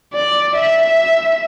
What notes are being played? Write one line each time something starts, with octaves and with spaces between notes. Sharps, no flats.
D5
E5